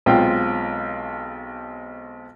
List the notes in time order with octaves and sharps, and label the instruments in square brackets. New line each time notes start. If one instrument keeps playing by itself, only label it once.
[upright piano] B1 G#3 C4 F4 G5